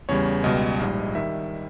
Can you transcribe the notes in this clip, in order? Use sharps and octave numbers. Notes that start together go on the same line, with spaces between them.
E2 C#3 G3 C#5
C#2 B2 G3 D#5
A#1 G#2 G3
D#3 G3 E5